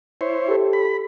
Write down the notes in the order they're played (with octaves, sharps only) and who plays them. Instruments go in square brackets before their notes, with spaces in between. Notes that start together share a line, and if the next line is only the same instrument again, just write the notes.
[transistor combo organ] E4 C5 C#5
[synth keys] G4 A4
[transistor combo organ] B5